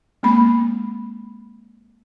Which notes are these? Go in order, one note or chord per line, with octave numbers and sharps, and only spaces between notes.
G#3 A#3 C4 B5